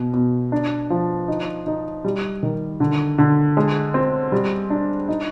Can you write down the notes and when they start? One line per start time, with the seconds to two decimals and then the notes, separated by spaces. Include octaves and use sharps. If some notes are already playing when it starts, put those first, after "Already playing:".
Already playing: B2
0.14 B2
0.52 D4
0.90 F3
1.28 D#4
1.67 D#4
2.05 G3
2.43 D#3
2.80 D3
3.18 D3
3.57 G#3
3.94 C4
4.32 G3
4.70 D4
5.08 D#4